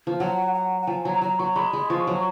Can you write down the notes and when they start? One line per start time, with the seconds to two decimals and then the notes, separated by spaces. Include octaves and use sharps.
0.07 F3
0.20 F#3 F#5
0.54 F#5
0.82 F#5
0.87 F3 G#5
1.05 F#3 A#5
1.21 F#3 A#5
1.39 F#3 C#6
1.56 G#3 B5
1.73 G#3
1.90 F3 C#6
2.07 F#3